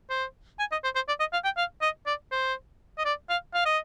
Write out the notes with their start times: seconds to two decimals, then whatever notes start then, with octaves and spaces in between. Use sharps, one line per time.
0.10 C5
0.59 G#5
0.72 D#5
0.84 C5
0.95 C5
1.08 D5
1.20 D#5
1.33 F5
1.44 G5
1.57 F5
1.81 D#5
2.06 D5
2.31 C5
2.98 D#5
3.05 D5
3.29 F5
3.54 F5
3.66 D#5